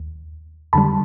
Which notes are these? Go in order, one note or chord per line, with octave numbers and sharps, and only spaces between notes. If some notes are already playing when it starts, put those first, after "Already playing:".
Already playing: D#2
F2 D3 G3 A5 B5